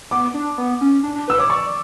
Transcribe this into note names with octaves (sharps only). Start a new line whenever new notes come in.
B3 D6
D4
B3
C#4
D4
D4
B4 E6
C#5 D6
D5 C#6